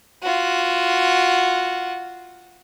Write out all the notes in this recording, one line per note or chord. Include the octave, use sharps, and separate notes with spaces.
F4 F#4